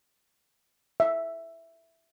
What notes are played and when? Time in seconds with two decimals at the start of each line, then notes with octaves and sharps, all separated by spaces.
1.00 E5